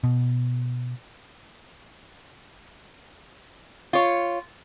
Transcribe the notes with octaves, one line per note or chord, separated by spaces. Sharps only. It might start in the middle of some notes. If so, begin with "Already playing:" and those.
B2
F4 C#5